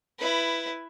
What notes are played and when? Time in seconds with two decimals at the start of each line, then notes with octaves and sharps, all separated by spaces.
0.19 E4 B4